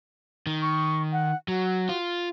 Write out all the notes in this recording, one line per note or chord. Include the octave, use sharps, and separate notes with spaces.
D#3
C#6
F#5
F#3 F#4
F4